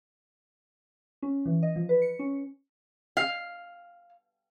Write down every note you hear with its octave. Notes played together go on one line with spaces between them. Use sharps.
C#4
E3
D#5
F3
B4
C#7
C#4
F5